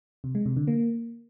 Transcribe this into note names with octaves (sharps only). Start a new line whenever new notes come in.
C3
G#3
C3
D3
A#3